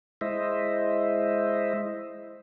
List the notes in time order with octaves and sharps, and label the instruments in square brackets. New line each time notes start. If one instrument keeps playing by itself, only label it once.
[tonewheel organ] G#3 E4 C5 D#5 E5